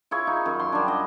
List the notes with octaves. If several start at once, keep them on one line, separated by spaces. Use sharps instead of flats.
E4 F4 G#4 C#5
D#4
F#2
C6
G3 D4
D#5